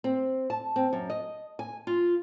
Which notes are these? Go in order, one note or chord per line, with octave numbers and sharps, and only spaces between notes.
C4
A5
C4
F#2
D#5
G#5
F4